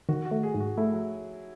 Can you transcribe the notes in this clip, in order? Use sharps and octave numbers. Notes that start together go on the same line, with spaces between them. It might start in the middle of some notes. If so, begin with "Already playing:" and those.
D#3 F#4
F#4
A3
G#4
G#2
F#4
A3 E4
F#3